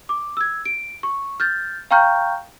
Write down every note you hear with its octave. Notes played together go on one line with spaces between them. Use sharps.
D6
E6 G#6
D7
C#6
F6 G6 A6
F5 G5 A#5 C#6 F6 G6